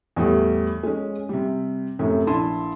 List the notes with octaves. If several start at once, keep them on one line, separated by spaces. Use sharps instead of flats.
E2 A2 G3
G#3 C#4
C3 G3
F#2 A2 C3
A#1 E4 A5 C6